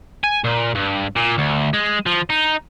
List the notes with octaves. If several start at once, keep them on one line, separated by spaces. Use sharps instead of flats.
G#5
A#2
G2
A#2
D2
G#3
F3
D#4